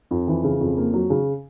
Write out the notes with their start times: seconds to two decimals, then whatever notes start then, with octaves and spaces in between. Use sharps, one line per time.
0.11 F2
0.28 E3
0.44 C#3
0.60 F2
0.77 A#3
0.94 F#3
1.10 C#3